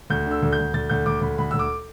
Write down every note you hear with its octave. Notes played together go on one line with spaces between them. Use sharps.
D2 G6
D3
E6
D2
G6
D2
D2 A6
D2 G6
D2 D6
D2 B5
D2 B5
D2 E6
D6